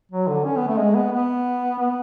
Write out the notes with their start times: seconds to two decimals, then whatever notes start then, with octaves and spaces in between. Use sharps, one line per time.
0.12 F#3
0.27 D3
0.45 C#4
0.56 B3
0.68 A3
0.78 G#3
0.95 B3
1.12 B3
1.79 B3